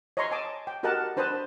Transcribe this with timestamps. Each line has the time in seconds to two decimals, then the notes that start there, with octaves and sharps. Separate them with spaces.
0.17 C#5 D#5 E5 A#5 C6 C#6
0.31 D#5 G#5 A5 D6 D#6
0.67 G5
0.83 F#4 G4 A#4 D#5 F#5 A5
1.17 D4 B4 C5 A5 B5 D#6